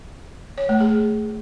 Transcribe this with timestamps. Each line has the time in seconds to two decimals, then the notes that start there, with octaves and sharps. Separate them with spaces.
0.58 C#5
0.69 A3
0.81 G#4